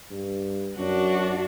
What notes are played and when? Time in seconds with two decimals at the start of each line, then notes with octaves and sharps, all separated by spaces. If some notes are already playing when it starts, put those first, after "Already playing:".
0.11 G2
0.77 F#2 D4 F#4